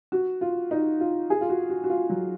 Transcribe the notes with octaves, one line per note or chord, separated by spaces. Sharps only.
F#4
F4
D#4
F4
G#4
F4
F#4
F#4
F#4
F4
F#3